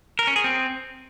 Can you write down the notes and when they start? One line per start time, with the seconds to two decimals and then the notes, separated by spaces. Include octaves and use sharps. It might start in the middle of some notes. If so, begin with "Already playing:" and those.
0.19 A#4
0.27 C#4
0.36 G#4
0.44 C4